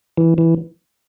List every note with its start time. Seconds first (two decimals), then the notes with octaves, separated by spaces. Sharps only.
0.17 E3
0.38 E3